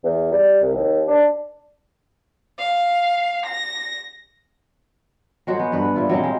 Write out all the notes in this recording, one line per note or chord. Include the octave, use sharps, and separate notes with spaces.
E2
G3
C2
D#2
D4
F5
A#6
F#3 G#3 F#4 C5
B3
G2 B4
A#2 E4 F4
F#3 G#3 A#3 C4
G#3